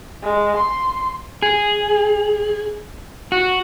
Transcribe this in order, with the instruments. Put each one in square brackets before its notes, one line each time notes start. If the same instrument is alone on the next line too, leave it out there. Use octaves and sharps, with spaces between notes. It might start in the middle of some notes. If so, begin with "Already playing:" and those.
[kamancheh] G#3
C6
[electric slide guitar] G#4
F#4